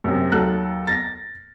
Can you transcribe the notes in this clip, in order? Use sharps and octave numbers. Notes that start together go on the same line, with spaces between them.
F#2 C3
D#2 F#3 A4 F#6
A6 A#6